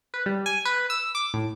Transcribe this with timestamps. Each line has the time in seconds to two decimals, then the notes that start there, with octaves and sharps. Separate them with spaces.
0.14 B4
0.26 G3
0.46 G#5
0.65 B4
0.90 E6
1.15 D6
1.34 A2